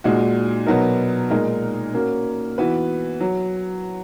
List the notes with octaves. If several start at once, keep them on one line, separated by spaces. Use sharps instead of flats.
A#2 G#3 D#4 F#4
B2 F#3 B3 D#4 A#4
A#2 G#3 D#4 A#4
A#3 C#4 F#4 A#4
E3 B3 F#4 B4
F#3